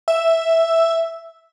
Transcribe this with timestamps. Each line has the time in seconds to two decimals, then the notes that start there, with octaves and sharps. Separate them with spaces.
0.08 E5